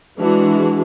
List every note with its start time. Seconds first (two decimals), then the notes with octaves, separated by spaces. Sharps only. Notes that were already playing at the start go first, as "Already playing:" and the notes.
0.18 E3 G#3 D4 F#4